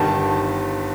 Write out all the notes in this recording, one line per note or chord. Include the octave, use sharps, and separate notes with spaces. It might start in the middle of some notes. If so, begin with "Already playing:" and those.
Already playing: G1 G2 D#3 A5